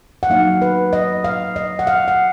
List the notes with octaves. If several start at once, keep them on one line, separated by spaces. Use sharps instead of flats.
F#5
F#3 A#3 D#4 F5
B4
D#5
F5
D#5
F#5
F5
F#5